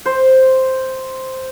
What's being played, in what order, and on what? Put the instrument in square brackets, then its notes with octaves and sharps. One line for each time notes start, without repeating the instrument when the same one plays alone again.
[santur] C5